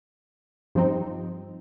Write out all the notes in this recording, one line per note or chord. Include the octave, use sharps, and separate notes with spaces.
G2 F3 C4 D#4